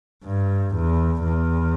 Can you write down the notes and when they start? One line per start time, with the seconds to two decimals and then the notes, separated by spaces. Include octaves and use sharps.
0.24 G2
0.75 E2
1.24 E2